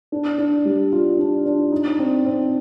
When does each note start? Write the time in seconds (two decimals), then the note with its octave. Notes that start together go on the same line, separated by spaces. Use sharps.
0.12 D4
0.38 D4
0.65 G3
0.92 F4
1.19 D4
1.46 D4
1.72 D#4
1.99 C4
2.25 C4